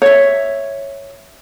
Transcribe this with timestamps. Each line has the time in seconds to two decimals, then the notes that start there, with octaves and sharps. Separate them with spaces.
0.02 C#5 E5